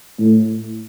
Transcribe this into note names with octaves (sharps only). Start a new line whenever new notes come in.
A2